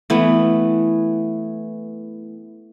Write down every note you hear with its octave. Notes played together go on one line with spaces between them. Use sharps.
E3 A3 B3